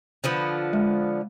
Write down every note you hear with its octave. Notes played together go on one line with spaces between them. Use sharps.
D3 F3 B3
G#3